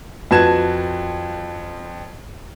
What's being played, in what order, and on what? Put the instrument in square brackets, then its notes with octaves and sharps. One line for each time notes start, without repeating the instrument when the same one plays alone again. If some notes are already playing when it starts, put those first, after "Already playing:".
[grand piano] F2 F#4 B4 A5 G#6 E7